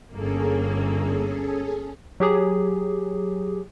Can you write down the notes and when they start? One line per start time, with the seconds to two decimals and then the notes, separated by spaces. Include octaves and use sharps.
0.13 G1 A#3 C#4 G#4 A4
2.20 F#3 G4 G#4